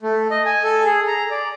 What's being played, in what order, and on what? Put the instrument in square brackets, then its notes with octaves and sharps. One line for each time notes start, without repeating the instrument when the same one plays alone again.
[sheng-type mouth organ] A3
D#5
G#5
A4
G#4
A#5
D5